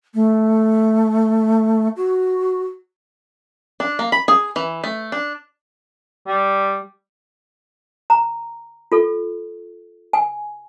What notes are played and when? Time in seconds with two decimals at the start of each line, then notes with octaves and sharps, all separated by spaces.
0.14 A3
1.96 F#4
3.80 D4
3.99 A#3
4.12 B5
4.28 G#4
4.56 E3
4.84 A3
5.12 D4
6.27 G3
8.10 A#5
8.92 F4 A4
10.13 G#5